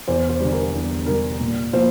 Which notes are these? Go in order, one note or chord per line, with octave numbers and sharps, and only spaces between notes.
E2 C5
C5
D3 G3
A#4
E2
D3 G3 A#4
A#2
F3 A#3 C5